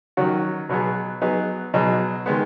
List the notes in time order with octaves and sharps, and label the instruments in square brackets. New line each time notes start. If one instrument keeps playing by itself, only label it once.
[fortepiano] D#3 F#3 C#4 F#4
B2 F#3 B3 G#4
F#3 B3 D#4 G#4
B2 F#3 D#4 G#4
D#3 G#3 B3